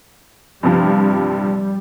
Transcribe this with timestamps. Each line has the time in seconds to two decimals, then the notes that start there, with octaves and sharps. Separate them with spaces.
0.63 G2 C3 F3 G3